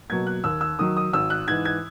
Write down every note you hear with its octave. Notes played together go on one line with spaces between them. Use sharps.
B2 F#3 A#3 G#6
F#6
D#2 E6
E6
D#3 F#3 D#6
D#6
G#1 E6
F#6
G#2 E3 G#6
G#6